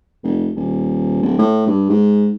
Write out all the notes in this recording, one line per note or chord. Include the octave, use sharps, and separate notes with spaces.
F1
D#1
D1
A2
G2
G#2